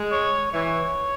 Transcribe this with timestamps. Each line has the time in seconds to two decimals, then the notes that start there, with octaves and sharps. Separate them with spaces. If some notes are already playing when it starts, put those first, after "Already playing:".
Already playing: G#3
0.12 C#5
0.52 E3 C#5